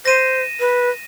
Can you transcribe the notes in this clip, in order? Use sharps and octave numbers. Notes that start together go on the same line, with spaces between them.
C5 A#6 D#7 E7
B4